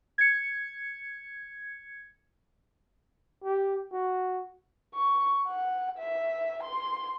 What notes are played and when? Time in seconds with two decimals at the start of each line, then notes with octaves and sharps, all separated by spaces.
0.18 G#6 C#7
3.44 G4
3.92 F#4
4.94 C#6
5.47 F#5
5.99 E5
6.64 C6